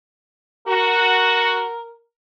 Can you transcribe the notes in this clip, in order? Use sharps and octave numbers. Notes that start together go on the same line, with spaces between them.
F#4 A#4